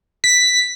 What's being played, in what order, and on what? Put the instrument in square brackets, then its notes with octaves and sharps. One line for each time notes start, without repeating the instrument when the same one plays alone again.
[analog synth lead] B6